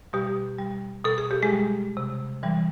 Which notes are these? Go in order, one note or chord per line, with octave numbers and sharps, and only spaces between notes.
B2 G3 G4
G3
B2 A4
G#4
G4
G#3 G#4
G3
C3
E3 G3